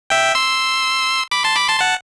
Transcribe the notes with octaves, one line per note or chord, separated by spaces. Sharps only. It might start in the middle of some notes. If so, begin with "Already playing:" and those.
E5 G5
C6 E6
B5 D6
A5 C6
B5 D6
A5 C6
F#5 A5